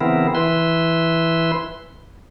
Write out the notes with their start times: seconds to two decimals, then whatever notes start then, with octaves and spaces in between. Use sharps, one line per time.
0.01 C#3 E3 B3 C4 E4 A#4
0.35 E3 E4 B4 C6